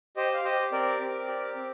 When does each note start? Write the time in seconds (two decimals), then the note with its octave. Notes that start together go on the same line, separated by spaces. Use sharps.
0.16 G4 C5 D#5
0.33 F5
0.44 G4 C5 D#5
0.72 C4 A#4 D5
1.00 C4
1.28 G4
1.56 C4